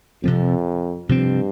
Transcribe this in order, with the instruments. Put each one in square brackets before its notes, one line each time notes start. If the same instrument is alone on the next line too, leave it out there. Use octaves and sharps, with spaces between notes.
[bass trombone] F2 [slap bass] C3 F3 C4
[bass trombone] G2 [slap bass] C3 F3 C4